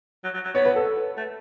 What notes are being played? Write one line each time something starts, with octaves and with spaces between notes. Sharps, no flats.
F#3
F#3
F#3
B3 C#5
B4
A4
A3